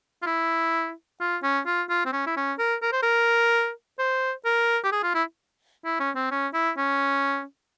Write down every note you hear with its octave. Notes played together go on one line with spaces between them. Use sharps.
F4
E4
F4
C#4
F4
F4
C4
C#4
E4
C#4
A#4
A#4
C5
A#4
C5
A#4
G4
G#4
F4
E4
E4
C#4
C4
C#4
E4
C#4